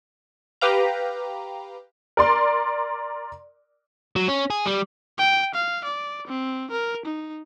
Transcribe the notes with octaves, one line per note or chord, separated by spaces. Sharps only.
G4 B4 F5 A#5
A#4 D5 C6
F#3
C#4
G#4
G3
G5
F5
D5
C4
A#4
D#4